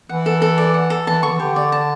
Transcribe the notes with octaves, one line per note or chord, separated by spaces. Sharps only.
E3 F#5
A4
A4
D5
F#5
A4
E3 A5
D3 C#6
E3
D3 G4
D5
A5